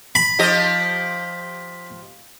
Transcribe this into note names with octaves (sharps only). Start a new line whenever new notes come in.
B5
F3 G4 D#5